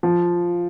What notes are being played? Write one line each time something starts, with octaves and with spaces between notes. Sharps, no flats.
F3